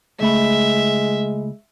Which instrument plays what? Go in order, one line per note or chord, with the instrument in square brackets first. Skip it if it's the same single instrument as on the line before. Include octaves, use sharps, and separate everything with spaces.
[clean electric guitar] C#2 A3 B5 [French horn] G#3 [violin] E5